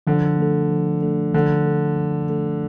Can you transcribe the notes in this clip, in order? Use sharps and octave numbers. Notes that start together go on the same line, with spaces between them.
D3 F3
A3 D4 A4
F3
A3 D4 A4
D3 F3
A3 D4 A4
F3
A3 D4 A4